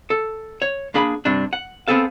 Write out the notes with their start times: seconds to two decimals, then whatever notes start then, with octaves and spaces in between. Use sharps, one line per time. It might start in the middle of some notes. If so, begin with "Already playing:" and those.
0.10 A4
0.62 C#5
0.94 A#3 D4 G#4 B5
1.25 G2 C3 D4
1.53 F#5
1.88 B3 C4 G#4 A4 F5